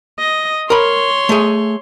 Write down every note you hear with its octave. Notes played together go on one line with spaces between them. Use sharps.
D#5
A#4 C#5 B5 C6
A3 G#4